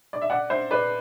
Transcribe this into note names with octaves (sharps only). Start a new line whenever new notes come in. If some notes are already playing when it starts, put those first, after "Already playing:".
D5
E5
D5 F#5
C5 E5
B4 D5